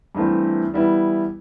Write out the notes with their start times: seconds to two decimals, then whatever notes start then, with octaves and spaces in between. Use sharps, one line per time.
0.15 G2 E3 A3 C4
0.73 E3 G3 B3 E4